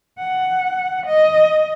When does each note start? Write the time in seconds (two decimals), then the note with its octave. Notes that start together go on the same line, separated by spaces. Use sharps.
0.19 F#5
1.06 D#5